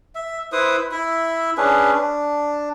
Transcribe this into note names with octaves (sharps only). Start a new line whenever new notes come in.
E5
E4 B4 C5 D#6
E4 E5
C#4 D4 G#4 B4
D4